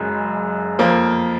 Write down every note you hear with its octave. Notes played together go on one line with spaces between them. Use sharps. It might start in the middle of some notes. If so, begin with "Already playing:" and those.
Already playing: F#1 F#2 C#3 G#3
F2 F3 A#3